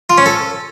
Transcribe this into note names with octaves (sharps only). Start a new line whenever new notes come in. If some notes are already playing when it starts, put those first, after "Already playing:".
F4
C#4
A4